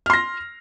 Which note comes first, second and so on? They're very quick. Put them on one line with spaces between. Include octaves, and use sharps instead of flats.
F6 C6 A#6